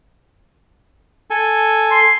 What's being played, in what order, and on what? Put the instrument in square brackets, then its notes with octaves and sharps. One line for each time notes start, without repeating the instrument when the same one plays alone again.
[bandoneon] A4 G#5
[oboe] C6